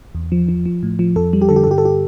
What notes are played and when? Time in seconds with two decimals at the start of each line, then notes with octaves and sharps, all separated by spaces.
0.15 E2
0.32 F3
0.49 F3
0.65 F3
0.83 A2
0.99 F3
1.16 F2 A4
1.33 G3
1.42 G4
1.49 D3 A4
1.56 G4
1.64 A4
1.67 G2 G4
1.78 A4
1.85 G4